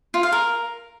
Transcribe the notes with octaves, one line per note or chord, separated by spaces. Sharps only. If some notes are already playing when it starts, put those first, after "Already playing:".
F4
F5
A#4